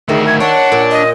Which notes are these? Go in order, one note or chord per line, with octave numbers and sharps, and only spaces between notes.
D2 D#3 E4 G#4
G#6
D4 C#5 E5 F#5
A#2
D#5